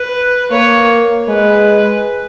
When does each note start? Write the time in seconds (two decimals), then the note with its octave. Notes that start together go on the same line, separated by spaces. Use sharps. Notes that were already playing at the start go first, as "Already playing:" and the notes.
Already playing: B4
0.51 A#3 C#5
1.29 G#3 B4